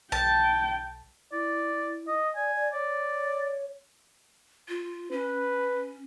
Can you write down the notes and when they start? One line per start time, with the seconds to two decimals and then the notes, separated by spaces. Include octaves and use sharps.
0.12 B1 G5 A5
1.32 E4 D5
2.08 D#5
2.36 D5 G#5
2.55 D5
2.73 C#5 D5
4.69 F4
5.12 C#4 B4